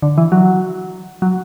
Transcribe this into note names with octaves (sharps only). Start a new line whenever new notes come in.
D3
E3
F#3
F#3